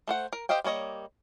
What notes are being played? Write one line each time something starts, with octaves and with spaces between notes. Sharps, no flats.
A3 C5 F#5
A#4
G4 C5 D#5 F5 G5
G3 A#3 C#5 D#5